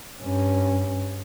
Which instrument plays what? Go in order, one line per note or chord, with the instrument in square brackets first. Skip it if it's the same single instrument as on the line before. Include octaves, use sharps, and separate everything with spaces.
[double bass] G2 C#4